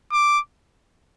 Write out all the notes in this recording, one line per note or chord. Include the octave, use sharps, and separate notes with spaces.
D6